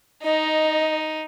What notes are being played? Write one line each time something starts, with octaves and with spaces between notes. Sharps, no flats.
D#4 D#5